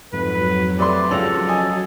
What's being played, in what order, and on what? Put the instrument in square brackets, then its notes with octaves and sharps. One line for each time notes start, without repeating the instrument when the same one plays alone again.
[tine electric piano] F2 G#2 [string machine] F#3 [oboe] B4
[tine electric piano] A3 C4 G4 [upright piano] B4 C6 [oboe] D5
[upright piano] C#2 C#4 F7 [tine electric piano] F3 A#6 [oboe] A4
[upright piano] D#5 G#5